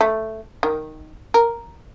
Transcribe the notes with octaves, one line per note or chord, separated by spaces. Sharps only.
A3
D#3
A#4